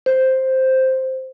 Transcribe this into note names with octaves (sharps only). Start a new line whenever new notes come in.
C5